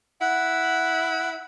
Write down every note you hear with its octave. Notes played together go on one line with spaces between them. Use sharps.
E4 F#5